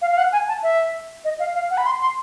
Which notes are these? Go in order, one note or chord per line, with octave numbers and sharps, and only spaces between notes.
F5
F5
F#5
G#5
A5
E5
D#5
F5
F5
F#5
B5
C6
C6